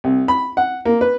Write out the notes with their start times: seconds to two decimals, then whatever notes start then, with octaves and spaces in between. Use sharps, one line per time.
0.04 C2
0.28 B5
0.57 F#5
0.86 A#3
1.01 B4